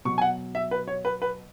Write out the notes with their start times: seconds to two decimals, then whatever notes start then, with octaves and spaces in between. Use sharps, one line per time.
0.05 B2 F#3 C#6
0.18 G#5
0.22 F#5
0.55 E5
0.71 B4
0.88 C#5
1.05 B4
1.22 B4